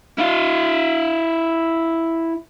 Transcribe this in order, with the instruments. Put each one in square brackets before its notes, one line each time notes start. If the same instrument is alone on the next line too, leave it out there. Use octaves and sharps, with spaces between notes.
[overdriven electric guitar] E4 F5